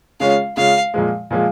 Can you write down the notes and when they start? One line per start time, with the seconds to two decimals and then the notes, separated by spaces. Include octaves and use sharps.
0.20 C#3 G#3 C#4 F4 F5
0.57 C#3 G#3 C#4 F4 F5
0.94 A#2 F3 G#3
1.31 A#2 F3 G#3